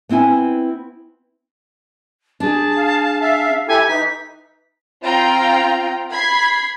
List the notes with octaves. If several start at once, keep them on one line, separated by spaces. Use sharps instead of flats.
B3 C4 E4 B4 G#5
D4 G#4 A5
F5
E5 F5
E4 G4 A4 G#5
E3 D#4 B6
C4 F4 F5 G5 A#5
B5 G#6 B6 C7